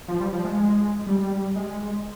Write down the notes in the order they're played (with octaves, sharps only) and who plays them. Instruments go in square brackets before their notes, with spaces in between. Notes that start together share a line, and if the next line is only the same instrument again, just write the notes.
[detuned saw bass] F3
G3
F3
G#3
G3
G#3